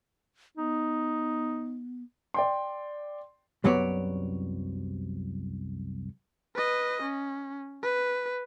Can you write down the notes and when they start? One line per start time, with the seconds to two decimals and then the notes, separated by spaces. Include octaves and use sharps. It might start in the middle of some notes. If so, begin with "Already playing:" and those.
0.57 B3 D#4
2.34 D5 G5 C6
3.64 C2 F#2 F#3 B3 C#5 D5
6.55 B4 D#5
7.02 C#4
7.82 B4